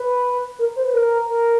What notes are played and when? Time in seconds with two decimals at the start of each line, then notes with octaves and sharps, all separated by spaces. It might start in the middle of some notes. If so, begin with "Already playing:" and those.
Already playing: B4
0.59 A#4
0.76 C5
0.85 B4
0.94 A#4
1.28 A#4